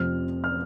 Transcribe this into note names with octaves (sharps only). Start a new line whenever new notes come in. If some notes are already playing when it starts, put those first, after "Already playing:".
Already playing: F1 F2 C3 F3 C4 F6
F6